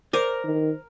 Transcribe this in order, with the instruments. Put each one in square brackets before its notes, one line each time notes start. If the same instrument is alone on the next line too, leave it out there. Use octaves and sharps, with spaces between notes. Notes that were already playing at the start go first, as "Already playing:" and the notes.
[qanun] A#4 [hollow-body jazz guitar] C5 D5
[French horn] D#3